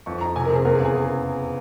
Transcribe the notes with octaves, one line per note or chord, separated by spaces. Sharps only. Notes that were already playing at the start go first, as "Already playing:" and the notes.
F2 C#6
F2 A#5
C3 G#5
A#4
C3
G#4
E2 A#4
G#4
C#3
G#4